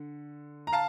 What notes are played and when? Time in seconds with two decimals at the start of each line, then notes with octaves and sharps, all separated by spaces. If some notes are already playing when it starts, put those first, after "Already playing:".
Already playing: D3
0.67 A#5
0.73 F5 A5